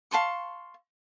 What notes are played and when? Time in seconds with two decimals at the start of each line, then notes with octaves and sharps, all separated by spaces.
0.11 F5 A5 C6 C#6